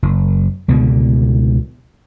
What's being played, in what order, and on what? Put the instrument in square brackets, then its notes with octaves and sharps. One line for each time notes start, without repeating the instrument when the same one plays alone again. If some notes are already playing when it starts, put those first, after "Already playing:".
[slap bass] F#1
C#2 B2 D3 G3